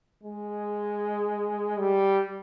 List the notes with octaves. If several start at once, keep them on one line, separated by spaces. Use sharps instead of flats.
G#3
G3